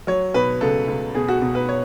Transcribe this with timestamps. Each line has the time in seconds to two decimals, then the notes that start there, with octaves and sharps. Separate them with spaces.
0.07 F#3 C#5
0.34 B2 B4
0.61 C#2 A4
0.88 C#2
1.14 B2 G#4
1.28 F#4
1.42 B2
1.55 B4
1.69 C#5